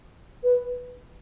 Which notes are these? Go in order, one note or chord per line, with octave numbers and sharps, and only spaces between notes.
B4